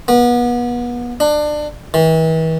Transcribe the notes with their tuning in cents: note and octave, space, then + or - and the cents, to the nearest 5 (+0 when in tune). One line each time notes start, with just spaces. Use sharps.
B3 -30
D4 +25
E3 -40